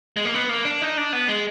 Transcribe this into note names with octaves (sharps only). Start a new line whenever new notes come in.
G#3
A#3
B3
A#3
D4
D#4
D4
B3
G#3